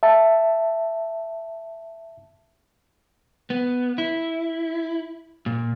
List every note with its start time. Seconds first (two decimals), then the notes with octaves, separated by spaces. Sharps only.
0.03 E5 A5
3.50 B3
3.98 E4
5.46 A#2